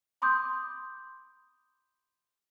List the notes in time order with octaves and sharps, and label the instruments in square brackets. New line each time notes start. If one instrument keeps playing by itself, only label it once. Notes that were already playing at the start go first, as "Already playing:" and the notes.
[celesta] B5 C6 D6 D#6 G6